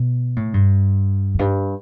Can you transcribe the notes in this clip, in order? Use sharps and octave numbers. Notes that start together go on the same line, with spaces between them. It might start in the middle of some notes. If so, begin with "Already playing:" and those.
Already playing: B2
A2
G2
F2
G2